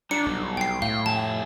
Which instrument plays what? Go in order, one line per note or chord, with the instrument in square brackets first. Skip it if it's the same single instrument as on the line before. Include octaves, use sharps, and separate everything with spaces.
[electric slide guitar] G3 G4 A#5 [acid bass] D4 [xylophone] C#7
[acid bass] B1
[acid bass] B1 [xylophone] G5 C7
[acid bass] A2 [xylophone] F5 [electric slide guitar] G5
[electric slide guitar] F2 G4 G#5 [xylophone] A5